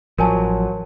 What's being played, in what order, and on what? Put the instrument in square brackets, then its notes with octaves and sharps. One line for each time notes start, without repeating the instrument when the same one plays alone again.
[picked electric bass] A1 F3 [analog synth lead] F#3 [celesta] A#4 G#5 A5